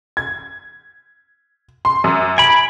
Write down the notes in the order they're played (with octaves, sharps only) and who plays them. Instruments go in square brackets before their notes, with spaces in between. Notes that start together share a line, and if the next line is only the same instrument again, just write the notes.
[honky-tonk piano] G#6
C6
F#2
[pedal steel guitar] G#5 B5 [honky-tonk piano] D7